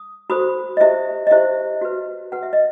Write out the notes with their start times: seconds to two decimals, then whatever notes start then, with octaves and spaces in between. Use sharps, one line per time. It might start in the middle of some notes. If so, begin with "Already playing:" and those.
Already playing: D#6
0.30 F#4 A4 C5 B5 D#6
0.77 D#5
0.81 E4 G4 C5 E5
1.27 D#5
1.31 E4 G4 C5 E5
1.81 F#4 B4
2.32 F#4 B4 F#5
2.43 E5
2.53 D#5